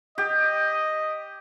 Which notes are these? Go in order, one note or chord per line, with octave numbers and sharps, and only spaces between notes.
G4 D#5